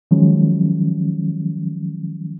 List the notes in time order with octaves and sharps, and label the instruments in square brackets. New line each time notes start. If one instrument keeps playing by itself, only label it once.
[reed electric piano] D#3 F3 F#3 G#3 C#4